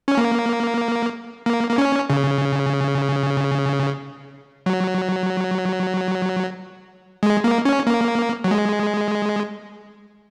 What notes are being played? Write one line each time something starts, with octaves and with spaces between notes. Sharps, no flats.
C#4
A#3
A#3
A#3
C#4
C#3
F#3
G#3
A#3
C#4
A#3
F#3
G#3